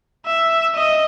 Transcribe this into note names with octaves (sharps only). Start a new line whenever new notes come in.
E5
D#5